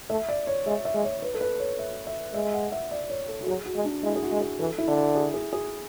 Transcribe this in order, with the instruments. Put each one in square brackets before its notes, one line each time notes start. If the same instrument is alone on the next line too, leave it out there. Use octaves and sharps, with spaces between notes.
[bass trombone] A3 [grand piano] E5
[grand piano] D5
C#5
[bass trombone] G#3 [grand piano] E5
[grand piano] E5
[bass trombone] G#3
[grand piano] C#5
B4
A4
B4
C#5
E5
E5
[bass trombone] G#3 [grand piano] E5
[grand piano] F#5
E5
D5
C#5
A4
F#4
[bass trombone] F#3 [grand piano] G#4
[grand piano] F#4
[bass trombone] G#3
[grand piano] D4
[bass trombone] G#3 [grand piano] E4
[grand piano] G#4
F#4
[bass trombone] G#3
[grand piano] G#4
[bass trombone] E3 [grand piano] A4
[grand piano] E4
[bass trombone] D3
[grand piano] G#4
G#4
G#4